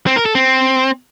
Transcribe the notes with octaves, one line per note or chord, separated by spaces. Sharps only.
C4
A#4
A4
C4